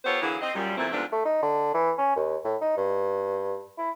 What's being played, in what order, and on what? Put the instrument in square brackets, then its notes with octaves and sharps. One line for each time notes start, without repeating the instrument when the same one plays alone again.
[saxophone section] B3 F4 G4 A4 C5 C#5
D3 E3 F#3 A#3 E4 G#4
C4 D#5
F#2 A#2 G3
E2 A#2 E3 A3 C4 E4
G#2 C3 F3 A3 B3 D4
[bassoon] A3
D#4
D3
E3
C#4
D#2
A2
D#4
G2
E4